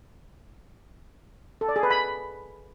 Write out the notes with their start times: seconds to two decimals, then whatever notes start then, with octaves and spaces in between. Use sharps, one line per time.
1.61 A4
1.69 D5
1.76 G#4
1.83 B4
1.91 B5